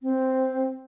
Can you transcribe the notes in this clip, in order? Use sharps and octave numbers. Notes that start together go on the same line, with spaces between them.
C4